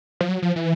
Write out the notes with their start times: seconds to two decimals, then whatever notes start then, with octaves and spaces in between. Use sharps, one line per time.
0.21 F3
0.29 F#3
0.42 F3
0.56 E3